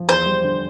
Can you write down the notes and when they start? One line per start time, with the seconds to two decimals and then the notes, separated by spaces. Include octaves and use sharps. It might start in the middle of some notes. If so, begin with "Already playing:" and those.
Already playing: F3
0.08 E2 C5
0.26 G3
0.44 D3